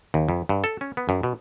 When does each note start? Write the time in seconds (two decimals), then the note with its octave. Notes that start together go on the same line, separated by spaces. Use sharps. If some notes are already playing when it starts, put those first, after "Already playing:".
0.14 D#2
0.29 F2
0.49 G2
0.64 A4
0.81 C#4
0.97 B3
1.09 F#2
1.23 B2